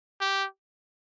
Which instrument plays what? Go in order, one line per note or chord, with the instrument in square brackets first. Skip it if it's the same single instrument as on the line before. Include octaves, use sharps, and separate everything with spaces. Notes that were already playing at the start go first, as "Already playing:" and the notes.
[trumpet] G4